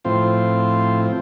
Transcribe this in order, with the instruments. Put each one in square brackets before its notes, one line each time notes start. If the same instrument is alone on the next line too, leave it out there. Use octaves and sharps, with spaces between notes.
[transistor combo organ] A2 F3 C4 F4